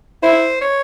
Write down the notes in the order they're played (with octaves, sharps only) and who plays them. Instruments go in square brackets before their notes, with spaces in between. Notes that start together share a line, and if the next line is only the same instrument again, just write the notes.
[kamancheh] E4 [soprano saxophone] C5
[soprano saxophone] C#5